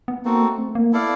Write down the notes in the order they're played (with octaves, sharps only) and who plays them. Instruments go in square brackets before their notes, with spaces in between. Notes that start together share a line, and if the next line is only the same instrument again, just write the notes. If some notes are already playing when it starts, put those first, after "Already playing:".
[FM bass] B3
[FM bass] A#3 [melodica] C4 D#4 F#4 A4
[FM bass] A3
C4
A3
A#3
[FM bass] B3 [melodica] E4 A4 D5 F5